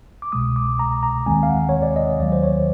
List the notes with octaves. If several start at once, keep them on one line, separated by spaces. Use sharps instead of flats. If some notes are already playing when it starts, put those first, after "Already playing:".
D6
C2 B2 G#3 D#6
D6
A#5
A#5
D#2 D#3 G#3 C4 G#5
F5
F#5
C#5
D5
D#5
D#2 D#3 F#3 D5
C5
C#5